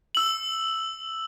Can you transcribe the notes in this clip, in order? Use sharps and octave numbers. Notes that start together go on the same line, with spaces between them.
E6 F#7